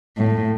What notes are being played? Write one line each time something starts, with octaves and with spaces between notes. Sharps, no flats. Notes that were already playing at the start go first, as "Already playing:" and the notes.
A2